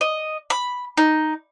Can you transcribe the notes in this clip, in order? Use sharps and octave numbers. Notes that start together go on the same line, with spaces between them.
D#5
B5
D#4